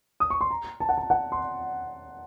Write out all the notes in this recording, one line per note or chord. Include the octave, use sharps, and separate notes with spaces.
D#6
C#6
C6
A#5
A5
F#5
A5
F#5
C6